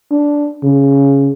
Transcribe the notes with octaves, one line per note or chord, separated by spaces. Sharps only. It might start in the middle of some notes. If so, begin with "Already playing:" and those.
D4
C#3